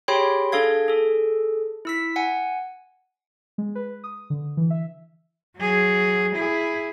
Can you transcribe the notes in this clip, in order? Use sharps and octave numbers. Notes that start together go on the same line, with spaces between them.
G4 G#4 C#5 G5 B5 C6
D4 G#4 A4 F5 G#6
G#4 A4
E4 E6 B6
F#5 G#5
G#3
B4
D#6
D3
E3
E5
F#3 G#4
E4 G#4